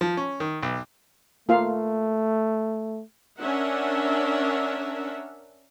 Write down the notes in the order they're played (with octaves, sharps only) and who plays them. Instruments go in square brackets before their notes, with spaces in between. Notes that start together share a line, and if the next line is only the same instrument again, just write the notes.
[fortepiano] F3
C#4
D#3
B1
[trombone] A3 [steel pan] A#3 F4 F5
[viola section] C#4 D4 A#4 E5 F#5